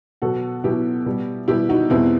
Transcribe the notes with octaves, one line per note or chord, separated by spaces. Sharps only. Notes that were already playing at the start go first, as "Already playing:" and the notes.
B2 F#3 F#4 A4
B2 F#3 E4 G4
B2 G3
B2 G3 E4 G4
D#4 F#4
E2 B2 G3 C4 E4